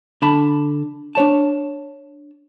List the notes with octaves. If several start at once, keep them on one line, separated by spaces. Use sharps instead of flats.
D3 A5 B5
D4 C#5 A5